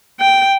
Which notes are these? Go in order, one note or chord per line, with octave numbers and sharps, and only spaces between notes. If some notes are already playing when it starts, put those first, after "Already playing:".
G5